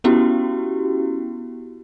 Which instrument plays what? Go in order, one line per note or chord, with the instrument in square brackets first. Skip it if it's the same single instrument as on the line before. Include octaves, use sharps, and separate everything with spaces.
[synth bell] B3 C#4 E4 F#4 G4